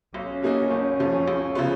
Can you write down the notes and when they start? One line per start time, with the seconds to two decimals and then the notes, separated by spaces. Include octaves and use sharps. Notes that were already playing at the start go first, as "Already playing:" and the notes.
0.14 B1 C#4
0.42 B2 A#3 D#4 F#4
0.71 F#1
0.99 F2 F3
1.28 C#2
1.55 C#3 F3 B3